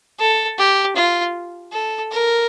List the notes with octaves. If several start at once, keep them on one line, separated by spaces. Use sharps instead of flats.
A4
G4
F4
A4
A#4